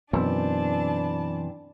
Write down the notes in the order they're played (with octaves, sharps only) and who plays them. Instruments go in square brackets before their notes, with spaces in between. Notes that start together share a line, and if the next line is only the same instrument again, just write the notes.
[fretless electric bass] F#2 B2 [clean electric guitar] E3 C4 [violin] D4 A5